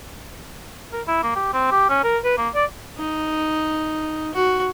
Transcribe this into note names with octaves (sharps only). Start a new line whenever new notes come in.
A#4
E4
A#3
G4
C4
G4
C#4
A#4
B4
A#3
D5
D#4
F#4